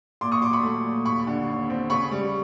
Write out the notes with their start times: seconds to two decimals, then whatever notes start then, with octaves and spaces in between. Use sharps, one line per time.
0.21 A#2 C6 D6
0.32 C#6 D#6
0.42 F#3 C6 D6
0.53 B5 C#6
0.63 A3
0.84 A#2
1.05 D#2 B5 C#6
1.27 D3
1.47 D#2
1.70 C4
1.90 C#3 B5 C#6
2.11 G3